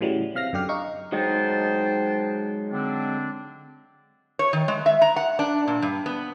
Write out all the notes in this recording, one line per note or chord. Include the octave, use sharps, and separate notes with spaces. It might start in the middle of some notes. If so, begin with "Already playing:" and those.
A2 C#3 E3 F#3 G3
C3 F5 F6 A#6
F#2 D3 G4 F6
D#4 F5 C#6
F#3 G#3 D#4 C5 G5 A5
D3 C4 D4
C#5
D#3
G#3
E5
A#5
F#5
D4
A#2
G2
B3